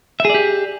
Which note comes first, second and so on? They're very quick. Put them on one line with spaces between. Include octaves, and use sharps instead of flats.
E5 G#4 D5 G4